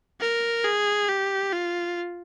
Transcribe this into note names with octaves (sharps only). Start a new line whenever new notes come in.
A#4
G#4
G4
F4